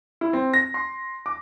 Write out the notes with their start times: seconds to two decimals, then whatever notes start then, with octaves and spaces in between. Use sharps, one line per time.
0.21 E4
0.33 C4
0.53 A#6
0.74 C6
1.26 D6